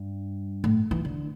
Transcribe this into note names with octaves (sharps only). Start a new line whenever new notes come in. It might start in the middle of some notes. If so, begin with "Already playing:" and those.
Already playing: G2
A2
E3
D3